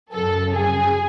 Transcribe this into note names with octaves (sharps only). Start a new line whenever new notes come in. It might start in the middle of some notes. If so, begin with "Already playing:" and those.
F#2 C#3 F#3 A4
G#4